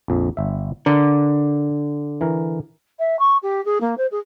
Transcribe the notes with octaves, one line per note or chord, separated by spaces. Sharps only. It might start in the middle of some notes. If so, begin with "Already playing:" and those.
A#1 F2
G1 E5
D3 A#4
E3 A#4
E5
C#6
G4
G#4
A#3
C5
G#4